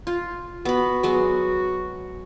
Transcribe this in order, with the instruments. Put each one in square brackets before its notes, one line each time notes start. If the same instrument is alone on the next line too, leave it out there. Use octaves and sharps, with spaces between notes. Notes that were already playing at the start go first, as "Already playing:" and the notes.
[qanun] F4
[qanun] B3 B5 [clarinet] F#4
[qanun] F#3 G#3 B3